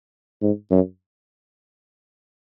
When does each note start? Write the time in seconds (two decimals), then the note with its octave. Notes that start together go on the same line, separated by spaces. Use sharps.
0.42 G#2
0.71 F#2